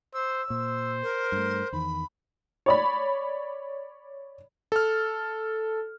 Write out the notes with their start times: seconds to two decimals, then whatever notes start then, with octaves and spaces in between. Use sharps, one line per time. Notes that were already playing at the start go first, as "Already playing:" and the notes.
0.14 C5 E6
0.50 A#2 C5
1.03 A#4
1.32 G2 A3
1.73 E2 D#3 B5
2.66 C#5 D5 B5
4.72 A4 F6